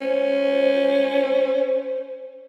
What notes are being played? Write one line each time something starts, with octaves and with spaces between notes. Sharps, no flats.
C#4 C5